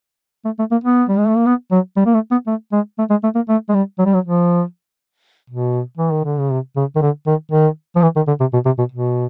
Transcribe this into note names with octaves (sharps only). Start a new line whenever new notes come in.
A3
A3
A#3
B3
G3
G#3
A3
A#3
B3
F#3
G3
A#3
A3
B3
A3
G#3
A3
G#3
A3
A#3
A3
G#3
G3
F#3
G3
F#3
F3
B2
E3
D#3
D3
C#3
C3
C#3
D#3
D3
D#3
D#3
F3
E3
D#3
D3
C3
B2
C3
B2
B2